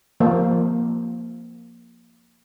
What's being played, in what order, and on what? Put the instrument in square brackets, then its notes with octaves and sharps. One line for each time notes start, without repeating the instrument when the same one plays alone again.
[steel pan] F3 A#3